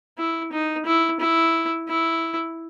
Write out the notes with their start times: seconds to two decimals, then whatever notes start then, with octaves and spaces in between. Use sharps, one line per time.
0.18 E4
0.53 D#4
0.85 E4
1.20 E4
1.88 E4